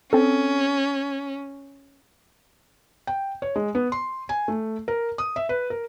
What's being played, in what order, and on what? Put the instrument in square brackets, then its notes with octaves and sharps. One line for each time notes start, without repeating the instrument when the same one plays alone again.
[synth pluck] C4 A4 [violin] C#4
[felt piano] G5
C#5
G#3
B3
C6
G#5
A3
A#4
D#6
E5
B4
A#4